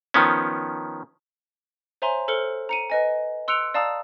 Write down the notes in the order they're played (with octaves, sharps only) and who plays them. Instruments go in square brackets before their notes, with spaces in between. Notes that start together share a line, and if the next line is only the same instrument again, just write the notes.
[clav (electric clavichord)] D#3 F3 B3 C#4
[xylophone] C5 C#5 E5 G#5 A#5 C6
A4 C5 F6 C#7 G7
A#5 C#7 D#7
B4 D#5 G#5
C6 E6 F#6 C#7 D7 F7
D5 F5 A5 A#5 D#6 E6